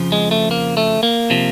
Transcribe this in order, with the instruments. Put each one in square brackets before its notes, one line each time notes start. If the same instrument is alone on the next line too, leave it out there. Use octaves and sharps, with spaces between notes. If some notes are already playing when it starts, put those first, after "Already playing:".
Already playing: [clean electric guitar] F2 C#3 F3
G#3
A3
A#3
A3
A#3
C3 F3